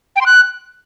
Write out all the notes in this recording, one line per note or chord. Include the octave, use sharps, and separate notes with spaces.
G5
C6
F#6